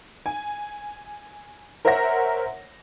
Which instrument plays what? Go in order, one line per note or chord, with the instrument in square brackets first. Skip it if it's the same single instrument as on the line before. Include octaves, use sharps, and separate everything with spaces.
[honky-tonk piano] G#5
A#4 C5 C#5 E5 F#5 A#6